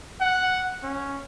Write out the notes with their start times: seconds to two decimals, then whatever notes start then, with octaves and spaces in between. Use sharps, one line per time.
0.21 F#5
0.83 C#4